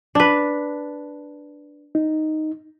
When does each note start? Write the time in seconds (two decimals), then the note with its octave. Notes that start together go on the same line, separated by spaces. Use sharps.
0.15 D4 B4
1.95 D#4